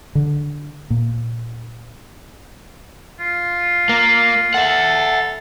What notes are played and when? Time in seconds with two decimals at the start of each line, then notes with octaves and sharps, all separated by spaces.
0.15 D3
0.90 A#2
3.20 F4
3.89 A#3
4.54 A4 E5 F#5